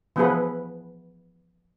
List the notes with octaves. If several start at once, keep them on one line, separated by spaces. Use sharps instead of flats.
E3 F3 B3 E4 G#4 B4